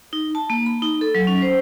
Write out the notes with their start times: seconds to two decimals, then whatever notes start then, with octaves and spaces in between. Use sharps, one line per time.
0.13 D#4
0.35 A5
0.50 A#3
0.66 B5
0.82 D#4
1.01 A4
1.15 F#3
1.27 C#4
1.42 C5